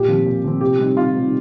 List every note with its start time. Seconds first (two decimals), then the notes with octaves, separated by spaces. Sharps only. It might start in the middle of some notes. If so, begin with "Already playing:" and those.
Already playing: A#2 G4
0.08 F3 C4
0.26 A#2
0.44 F3 C4
0.61 C3 G4
0.79 G3 C4 D#4
0.96 C3 F4
1.15 G3 C4 D#4